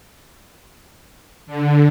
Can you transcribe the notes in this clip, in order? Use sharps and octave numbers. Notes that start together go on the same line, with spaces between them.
D3